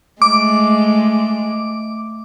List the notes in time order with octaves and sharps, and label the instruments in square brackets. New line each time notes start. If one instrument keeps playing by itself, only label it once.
[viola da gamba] G#3 A3 [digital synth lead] D6